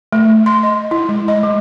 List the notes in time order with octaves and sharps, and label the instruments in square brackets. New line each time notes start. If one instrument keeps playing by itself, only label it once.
[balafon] A3
C6
D#5
E4
G#3
D#5
G#3